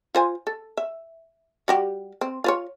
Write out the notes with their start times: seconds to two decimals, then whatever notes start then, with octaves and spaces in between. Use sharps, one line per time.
0.15 F4 C5 G#5
0.47 A4
0.77 E5
1.68 G3 F#4 G4
2.21 C4
2.44 F4 C5 C#5